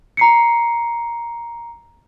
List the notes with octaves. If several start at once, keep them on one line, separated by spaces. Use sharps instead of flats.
A#5 C7 C#7